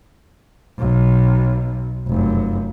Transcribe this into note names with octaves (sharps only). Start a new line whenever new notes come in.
B1 B2
F1 F#2